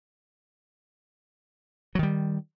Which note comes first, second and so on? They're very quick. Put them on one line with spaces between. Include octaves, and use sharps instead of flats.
F#3 D#3 G3